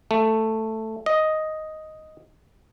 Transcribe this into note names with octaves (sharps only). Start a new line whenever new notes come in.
A3
D#5